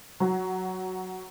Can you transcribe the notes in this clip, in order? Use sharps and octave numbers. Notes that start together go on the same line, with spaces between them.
F#3